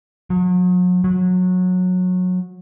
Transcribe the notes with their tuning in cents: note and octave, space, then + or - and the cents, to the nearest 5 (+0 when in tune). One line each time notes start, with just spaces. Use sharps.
F#3 -40
F#3 -20